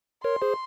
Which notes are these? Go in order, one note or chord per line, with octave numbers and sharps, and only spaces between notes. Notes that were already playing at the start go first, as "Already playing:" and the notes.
A#4 C#5 C6
G#4 C5